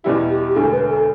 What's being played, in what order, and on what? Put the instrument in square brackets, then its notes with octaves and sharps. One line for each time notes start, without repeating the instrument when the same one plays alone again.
[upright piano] E2 B2 G3 E4 [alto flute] G4
[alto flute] G4
G4
[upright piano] E1 D2 D3 [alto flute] A4
[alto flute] B4
A4